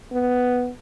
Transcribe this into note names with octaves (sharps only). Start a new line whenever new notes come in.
B3